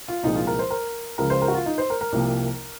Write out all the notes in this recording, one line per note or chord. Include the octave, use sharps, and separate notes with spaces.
F4
C2 A#2 F3 G#3 D#4
F4
A#4
C5
A#4
C#2 C#3 F3 G#3 A#4
C5
A#4
F#4
F4
D#4
C5
A#4
A#4
C2 C3 F3 A#3